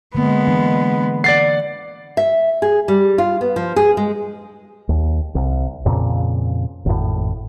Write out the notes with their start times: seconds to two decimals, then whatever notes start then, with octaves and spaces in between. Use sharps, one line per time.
0.15 D3 G#3 A#3 B3
0.47 E3 D4
1.24 D5 F#5 A6 C7
2.17 E5
2.62 G#4
2.88 G3
3.18 F4
3.41 B3
3.56 F3
3.76 G#4
3.97 G#3
4.89 D#2
5.35 C2
5.86 F2 A#2 C#3
6.85 G#1 F2 A2